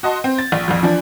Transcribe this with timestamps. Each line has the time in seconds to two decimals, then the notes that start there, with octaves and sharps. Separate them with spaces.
0.03 F#4 D#5 A5 C6
0.24 C4
0.38 A6
0.52 A#1
0.68 A#1 F2
0.83 E3 F3 D4